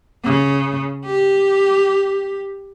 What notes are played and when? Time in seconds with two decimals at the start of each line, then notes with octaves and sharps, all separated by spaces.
0.25 C#3
1.06 G4